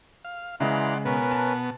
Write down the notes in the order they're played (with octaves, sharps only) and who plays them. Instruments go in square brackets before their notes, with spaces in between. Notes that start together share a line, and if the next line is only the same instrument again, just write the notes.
[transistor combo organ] F5
[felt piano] C#3 G#3 [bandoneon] E3 E4 A#5 [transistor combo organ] D5 F#5 C6
[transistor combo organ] B2 B3 [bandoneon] C#4 A#4 B4
[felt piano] A5